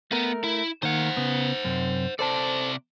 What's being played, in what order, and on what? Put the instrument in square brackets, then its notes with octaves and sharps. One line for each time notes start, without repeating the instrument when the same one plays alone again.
[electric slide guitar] A3 A#4 [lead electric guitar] B3
[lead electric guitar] E4
[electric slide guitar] D#3 A#3 [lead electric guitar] C5 F#5
[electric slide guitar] C#3 B3
F#2 C3
[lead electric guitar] C3 D5 [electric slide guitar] A4 C5 A5